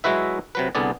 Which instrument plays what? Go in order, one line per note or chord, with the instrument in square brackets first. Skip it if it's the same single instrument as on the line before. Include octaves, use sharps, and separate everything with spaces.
[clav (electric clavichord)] F#3 G#3 E4 F#4 B4 E5
C3 F#3 B4
C2 D3 B3 G#4 D5